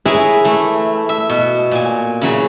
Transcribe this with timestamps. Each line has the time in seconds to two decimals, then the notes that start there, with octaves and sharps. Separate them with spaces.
0.06 E4 G#4 A#4 B4 C#5 E5
0.45 E3 A3
1.09 E5
1.30 B2
1.71 A#2 G#5
2.21 C#3 E3 F#3